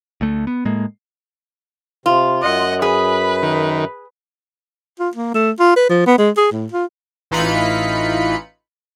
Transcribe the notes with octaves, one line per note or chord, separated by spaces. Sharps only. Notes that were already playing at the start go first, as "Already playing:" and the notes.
D2 A3
B3
A2 G#3 A#3
C3 F4
F#2 D#5 F#5
G#4 B4 B5
D#3
F4
A#3
A3
F4
B4
F3
B3
G#3
G#4
A2
F4
A1 E3 D#4 F4 B5 C#7